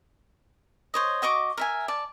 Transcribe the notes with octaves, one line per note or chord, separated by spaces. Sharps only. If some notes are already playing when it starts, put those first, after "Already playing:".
C5 C#5 D#5
F#4 D#5 C#6 D6
A#4 E5 G#5
D5 A5